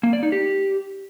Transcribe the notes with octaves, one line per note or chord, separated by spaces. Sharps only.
A#3
D5
D#4
G4